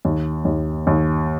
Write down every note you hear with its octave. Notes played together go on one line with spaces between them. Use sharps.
D#2
D#2
D#2